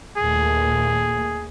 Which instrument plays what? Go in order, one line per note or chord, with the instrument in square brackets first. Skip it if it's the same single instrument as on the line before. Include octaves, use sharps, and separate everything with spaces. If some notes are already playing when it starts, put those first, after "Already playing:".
[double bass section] D#2 A#2 A3 [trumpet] G#4